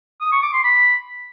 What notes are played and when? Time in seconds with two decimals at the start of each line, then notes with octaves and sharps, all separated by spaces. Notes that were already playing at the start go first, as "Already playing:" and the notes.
0.21 D#6
0.32 C#6
0.42 D6
0.53 C6
0.64 B5